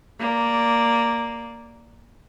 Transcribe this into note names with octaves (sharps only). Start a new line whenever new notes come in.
A#3 D5